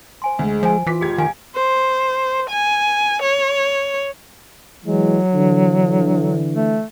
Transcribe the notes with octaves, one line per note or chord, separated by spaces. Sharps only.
C5 G#5 C6
D2 G#3
F3 C5 G#5
E3 F4 D6 B6
F1 G4 G#4 G#6
D#3 F5 G#5
C5
G#5
C#5
E3 F#3 G#3
D3 E3
A3